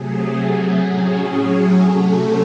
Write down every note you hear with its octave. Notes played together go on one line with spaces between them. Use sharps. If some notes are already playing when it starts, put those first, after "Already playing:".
Already playing: C3 F#3 A3 G#4
A2 F#3 C#4
C3 F#3 A3 C#4 A4